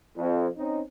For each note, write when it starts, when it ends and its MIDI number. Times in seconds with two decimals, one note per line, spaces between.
0.16 0.48 41
0.57 0.81 60
0.57 0.81 61
0.57 0.81 63